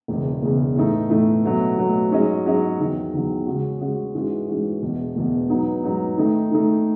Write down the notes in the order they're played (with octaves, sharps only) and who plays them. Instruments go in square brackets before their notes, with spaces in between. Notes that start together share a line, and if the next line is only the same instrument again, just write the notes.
[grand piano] E1 E2 C#3
E1 E2 C#3
A2 E3 A3 D#4
A2 E3 A3 D#4
B2 F#3 A3
B2 F#3 A3
G#2 F#3 C#4 G#4 D#5
G#2 F#3 C#4 G#4 D#5
E2 D#3 F#3
E2 D#3 F#3
C#3 G#3 C#4 F#4
C#3 G#3 C#4 F#4
G#2 E3 G#3 C#4 F#4
G#2 E3 G#3 C#4 F#4
E1 E2 B2
E1 E2 B2
G#2 F#3 B3 D#4
G#2 F#3 B3 D#4
D#3 A3 D#4
D#3 A3 D#4